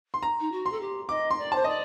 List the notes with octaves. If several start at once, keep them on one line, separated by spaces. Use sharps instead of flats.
C6
A#5
D#4
F#4
C6
A4
G4
D#5 D6
C6
D5
A5
C5
D5 D#5